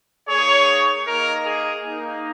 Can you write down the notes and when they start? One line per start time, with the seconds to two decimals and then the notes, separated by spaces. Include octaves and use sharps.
0.28 A#3 D#4 G#4 C#5
1.06 A#3 D#4 A#4
1.46 G#4
1.84 A#3 D#4